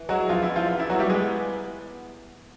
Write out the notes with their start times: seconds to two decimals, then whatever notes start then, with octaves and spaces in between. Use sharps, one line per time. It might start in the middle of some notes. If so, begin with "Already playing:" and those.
Already playing: E3
0.09 F#3 G#3 F#4
0.29 F3 B3 F4
0.43 E4
0.49 G#3
0.56 F3 F4
0.69 E3
0.80 E4
0.90 F#3 B3 F#4
0.99 G3 G4
1.09 G#3 B3 G#4